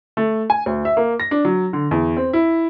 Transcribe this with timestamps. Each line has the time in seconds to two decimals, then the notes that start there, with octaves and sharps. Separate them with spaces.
0.17 A3
0.50 G#5
0.66 D2
0.85 E5
0.97 A#3
1.20 A#6
1.31 D4
1.45 F#3
1.73 D3
1.91 E2
2.17 C4
2.33 E4